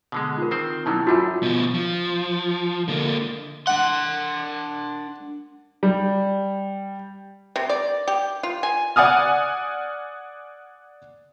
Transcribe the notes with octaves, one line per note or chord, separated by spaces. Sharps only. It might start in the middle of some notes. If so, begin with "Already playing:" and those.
B2 D3 G#3
F4 A#4
D#3 C4 C5
B2 F#3 G3 C#4 E4 A5
F#2 G3 A3 F4 F#4
B2 F3
F3
D3 A#3
D4 F#5 C6
G3
C3
D5
G4
F4
G#5
D5 F#5 G#5 D#6 F6